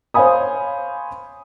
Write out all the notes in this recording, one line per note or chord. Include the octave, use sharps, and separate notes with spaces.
C5 C#5 F5 G#5 B5 D#6